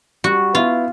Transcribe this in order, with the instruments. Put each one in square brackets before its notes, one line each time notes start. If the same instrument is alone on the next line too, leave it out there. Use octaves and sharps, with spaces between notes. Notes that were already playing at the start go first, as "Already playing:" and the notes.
[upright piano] G3 [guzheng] F#4
[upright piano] B3 E4 [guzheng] F4